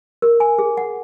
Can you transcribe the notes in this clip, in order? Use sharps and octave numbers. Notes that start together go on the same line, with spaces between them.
A#4
G#5
G#4
F#5